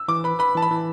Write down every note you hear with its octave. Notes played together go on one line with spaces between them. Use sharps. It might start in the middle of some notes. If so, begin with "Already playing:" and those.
Already playing: E6
E3 D6
B4 B5
B4 B5
E3 A5
B5
E3